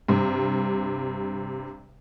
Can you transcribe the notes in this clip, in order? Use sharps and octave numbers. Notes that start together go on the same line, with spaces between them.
G2 C3